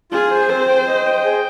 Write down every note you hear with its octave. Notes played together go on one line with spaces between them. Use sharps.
F4 G#4
C5
C4 C5
G5
D#5
G5
G#4